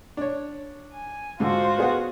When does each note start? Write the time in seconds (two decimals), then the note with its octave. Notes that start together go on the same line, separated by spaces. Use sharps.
0.17 D4 C#5
0.94 G#5
1.40 G#2 D3 F4 F#4 C5
1.77 B3 G#4 F#5